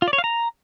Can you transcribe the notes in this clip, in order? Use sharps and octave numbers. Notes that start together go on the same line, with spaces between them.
F4
D5
C#5
F5
A#5